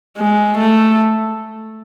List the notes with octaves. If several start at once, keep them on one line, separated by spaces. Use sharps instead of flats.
G#3
A3